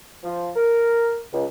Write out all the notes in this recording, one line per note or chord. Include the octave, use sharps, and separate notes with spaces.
F3
A#4
C#2